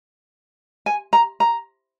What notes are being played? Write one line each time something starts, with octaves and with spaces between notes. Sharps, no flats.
G#5
A#5
A#5